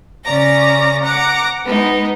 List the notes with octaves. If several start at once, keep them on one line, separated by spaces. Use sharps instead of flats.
C#3 C#4 D5 A#5 A#6
F#5 A#5 D6
G#3 B3 D#4